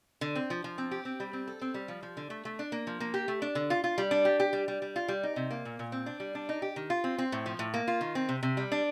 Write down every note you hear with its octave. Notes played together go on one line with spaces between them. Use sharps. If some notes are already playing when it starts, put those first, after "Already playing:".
D3
C4
F3
F3
C4
G4
C4
G3
C4
A4
C4
G3
F3
F3
D3
A3
A3
D4
A#3
F3
A#3
G4
A3
D4
D3
F4
F4
G3
D4
G4
G4
G3
G3
G3
F4
G3
D#4
C3
A#3
A#2
A#2
C4
D4
G3
D4
D#4
G4
D#3
F4
C4
C4
A2
F3
A2
A#3
F4
D#3
C4
C3
C3
G3
D4